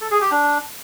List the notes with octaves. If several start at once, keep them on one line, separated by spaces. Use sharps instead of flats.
A4
G#4
G4
D4